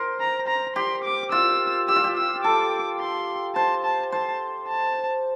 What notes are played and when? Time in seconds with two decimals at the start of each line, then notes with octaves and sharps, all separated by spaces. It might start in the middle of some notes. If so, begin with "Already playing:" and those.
Already playing: A#4 C5
0.20 A#5
0.48 A#5
0.76 G4 C6
1.04 D6
1.32 F4 E6
1.88 G4 E6
1.96 F4
2.04 G4
2.17 E6
2.44 A4 D6
3.00 C6
3.56 C5 A5
3.84 A5
4.12 C5 A5
4.68 A5